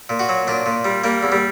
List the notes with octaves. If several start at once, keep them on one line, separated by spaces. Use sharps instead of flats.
A#2
F#4
F#3
A#2 D4
A#2
G3
G3 A#3
E2
G3